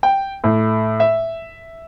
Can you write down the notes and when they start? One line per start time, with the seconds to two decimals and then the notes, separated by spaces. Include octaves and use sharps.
0.03 G5
0.44 A2
1.00 E5